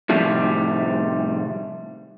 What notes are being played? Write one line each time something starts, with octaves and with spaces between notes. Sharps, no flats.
A2 C3 D#3 F3 G3